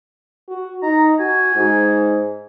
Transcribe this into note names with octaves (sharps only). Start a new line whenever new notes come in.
F#4
D#4 A#5
F#4 G#5
G#2